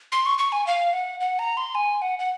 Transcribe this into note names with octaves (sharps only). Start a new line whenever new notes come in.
C6
C#6
C#6
G#5
F5
F#5
F#5
A#5
C6
G#5
F#5
F#5